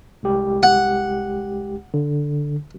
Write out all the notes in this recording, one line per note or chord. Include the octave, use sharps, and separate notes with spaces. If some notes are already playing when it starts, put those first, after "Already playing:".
C2 G#3 G4
F#5
D3